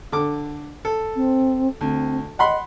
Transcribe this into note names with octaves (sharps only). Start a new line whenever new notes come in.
D3 D6
A4
C4
D2 C4
D#5 F#5 B5 C6